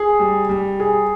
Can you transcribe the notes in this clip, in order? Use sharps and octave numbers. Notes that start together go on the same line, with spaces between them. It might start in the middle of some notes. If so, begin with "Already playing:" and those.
Already playing: G#4
G3
G3
G#4